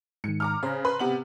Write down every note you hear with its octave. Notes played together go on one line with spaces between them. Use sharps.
G#2 D#3 C#7
A#5 D6 F6
C#3 C5 A#5
B4 B5 C6
C3 B3 F#7